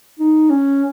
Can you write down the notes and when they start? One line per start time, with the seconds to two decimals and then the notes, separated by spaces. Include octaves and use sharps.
0.19 D#4
0.50 C#4